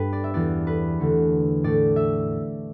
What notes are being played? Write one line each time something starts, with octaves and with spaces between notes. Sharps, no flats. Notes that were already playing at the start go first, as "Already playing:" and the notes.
Already playing: G2 G3 B3 B4
D5
E5
E2 E3 B3 D5
B4
E2 D3 A3
A2 A3 D5
E5